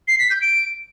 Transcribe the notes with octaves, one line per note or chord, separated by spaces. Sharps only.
C7
B6
G6
D7